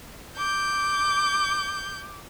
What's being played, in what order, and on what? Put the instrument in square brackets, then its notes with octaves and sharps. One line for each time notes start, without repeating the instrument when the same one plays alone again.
[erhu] D6 [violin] G6